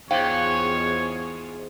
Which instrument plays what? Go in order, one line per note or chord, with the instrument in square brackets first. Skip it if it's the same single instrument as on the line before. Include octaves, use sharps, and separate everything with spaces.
[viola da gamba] E2 F4 G#4 [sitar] G#2 [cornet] C#5 [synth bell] F5 G5